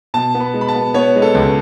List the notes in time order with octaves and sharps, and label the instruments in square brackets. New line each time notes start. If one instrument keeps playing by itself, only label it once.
[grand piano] B2 A5
B3
B5
G#3
B5
A5
B3
B3 C#5
G#3
A4
C#2